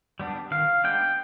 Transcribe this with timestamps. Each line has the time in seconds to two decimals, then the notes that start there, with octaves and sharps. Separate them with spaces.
0.20 G3 B3 D4
0.51 D#3 F5
0.84 G#3 B3 D4 G5